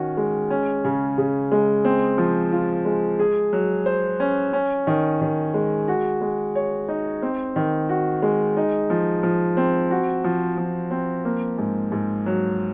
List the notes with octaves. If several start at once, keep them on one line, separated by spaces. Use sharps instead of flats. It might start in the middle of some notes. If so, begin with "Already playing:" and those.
Already playing: D#3 C#4 F#4
G#3
C#4
C#3
C#3
G#3
C4
F3
F4
G#3
G#4
F#3
C5
C#4
C#4
D#3
D#3
G#3
F#4
G#3
C#5
D#4
C4
D#3
F#4
G#3
D#4
F3
F3
C4
F#4
F3
F3
C4
A#3
G#2
G#2
F#3